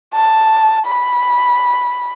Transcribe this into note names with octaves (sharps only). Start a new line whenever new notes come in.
A5
B5